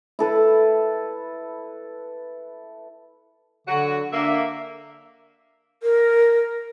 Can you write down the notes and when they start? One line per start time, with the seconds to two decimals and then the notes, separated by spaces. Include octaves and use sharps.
0.19 E4 A4 B4
3.67 D3 F#3 F#4
4.13 A#3 D4 E5
5.83 A#4